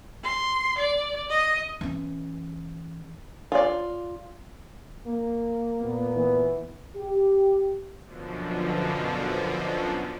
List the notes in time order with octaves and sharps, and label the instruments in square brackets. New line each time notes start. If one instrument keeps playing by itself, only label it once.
[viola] C6
D5
D#5
[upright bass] E3 C#4
[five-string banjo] F4 D5
[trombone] A#3
[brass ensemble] A#2 B3
[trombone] E3
[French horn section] G4
[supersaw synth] F#2 B2 D3 F3